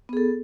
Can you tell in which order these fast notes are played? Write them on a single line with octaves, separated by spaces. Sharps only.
B3 G#4 A4